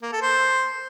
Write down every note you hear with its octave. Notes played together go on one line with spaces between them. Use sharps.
A#3
A4
C5